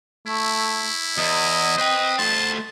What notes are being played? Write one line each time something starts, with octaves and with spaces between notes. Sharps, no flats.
A3 E4
E2 D#5
B4 C5 G5
A3 C5 A5